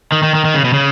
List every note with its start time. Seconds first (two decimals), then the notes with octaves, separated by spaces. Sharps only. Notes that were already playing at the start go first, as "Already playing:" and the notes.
0.12 D#3
0.23 D#3
0.35 D#3
0.45 D#3
0.54 C#3
0.65 B2
0.73 C#3